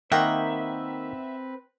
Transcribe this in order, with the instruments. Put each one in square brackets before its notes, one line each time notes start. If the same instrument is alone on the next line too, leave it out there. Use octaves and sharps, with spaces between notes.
[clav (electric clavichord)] D#3 A#3 [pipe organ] C4 B4 [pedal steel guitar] E5 [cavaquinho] F#5 G5 A#5